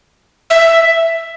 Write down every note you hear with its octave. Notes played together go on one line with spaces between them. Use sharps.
E5